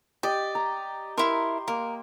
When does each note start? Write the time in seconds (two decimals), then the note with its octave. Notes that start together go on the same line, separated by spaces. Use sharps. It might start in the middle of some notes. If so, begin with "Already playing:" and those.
0.23 G4 D5 D#5
0.55 A#5
1.18 E4 A#4 C6
1.68 A#3 A#4